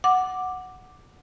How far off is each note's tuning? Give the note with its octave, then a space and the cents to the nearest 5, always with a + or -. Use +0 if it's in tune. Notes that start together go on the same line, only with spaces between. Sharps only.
F#5 +0 D6 +0